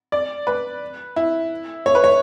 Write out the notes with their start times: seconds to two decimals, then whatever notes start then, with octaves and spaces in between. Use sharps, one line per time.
0.12 D5
0.47 B4
1.16 E4
1.86 C#5
1.95 B4
2.04 C#5